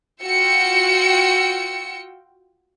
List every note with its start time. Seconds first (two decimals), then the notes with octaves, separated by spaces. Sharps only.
0.24 F4 F#4 G5 E6 C#7